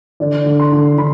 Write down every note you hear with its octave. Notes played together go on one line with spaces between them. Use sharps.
D3 D5
D3
C6
D3
D3 B5